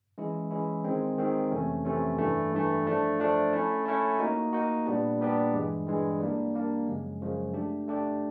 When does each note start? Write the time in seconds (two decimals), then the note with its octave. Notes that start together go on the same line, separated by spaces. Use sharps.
0.18 E3 G#3 C#4 E4
0.51 E3 G#3 C#4 E4
0.84 D#3 G#3 C4
1.18 D#3 G#3 C4
1.52 F2 C3 E3 A3 C#4
1.85 F2 C3 E3 A3 C#4
2.18 G2 E3 A3
2.52 G2 E3 A3
2.86 F3 A3 D4
3.20 F3 A3 D4
3.53 A3 C#4 E4
3.85 A3 C#4 E4
4.19 A#3 D#4 F#4
4.53 A#3 D#4 F#4
4.86 A#2 G3 B3 D4 G4
5.19 A#2 G3 B3 D4 G4
5.53 G2 E3 G#3
5.86 G2 E3 G#3
6.20 G3 A#3 D4
6.54 G3 A#3 D4
6.87 F#2 C#3 F3 G#3
7.21 F#2 C#3 F3 G#3
7.53 A3 D4 G4
7.88 A3 D4 G4